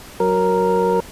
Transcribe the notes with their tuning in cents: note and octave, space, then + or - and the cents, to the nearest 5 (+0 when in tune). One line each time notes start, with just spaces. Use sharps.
F#3 +0 A#4 +0